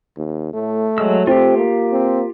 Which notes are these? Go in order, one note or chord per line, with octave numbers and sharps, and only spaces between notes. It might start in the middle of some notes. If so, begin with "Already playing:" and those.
D#2
A2 A3
F#3 G#3 E6
C4 F4 G4
A#3
C4